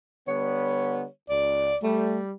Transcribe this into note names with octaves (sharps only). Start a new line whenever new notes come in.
D3 G3 B3 C#5
C#2 D5
G3 A3